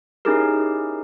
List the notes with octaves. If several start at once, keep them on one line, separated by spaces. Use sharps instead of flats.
C#4 D#4 E4 G4 G#4 A#4